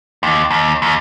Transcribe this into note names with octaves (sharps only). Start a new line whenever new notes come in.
D#2
D#2
D#2